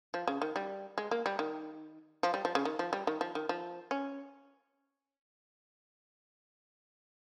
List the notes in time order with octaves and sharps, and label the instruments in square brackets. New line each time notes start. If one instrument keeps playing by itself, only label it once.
[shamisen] F3
C#3
D#3
G3
G#3
A#3
G3
D#3
F3
G3
F3
C#3
D#3
F3
G3
D#3
F3
D#3
F3
C#4